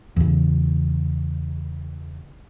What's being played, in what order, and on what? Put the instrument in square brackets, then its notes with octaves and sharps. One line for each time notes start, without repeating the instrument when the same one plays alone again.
[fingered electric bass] E2 C#3